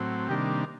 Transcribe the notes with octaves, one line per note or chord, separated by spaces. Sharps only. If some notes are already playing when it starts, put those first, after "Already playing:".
Already playing: A2 F#3 C4
C3 D#3 G3 A#3 D4 G4